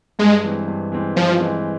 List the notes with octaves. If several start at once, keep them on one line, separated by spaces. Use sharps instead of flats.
G2 G#3
E3 G#3 C4
G2
E3 G#3 C4
G2 F3
E3 G#3 C4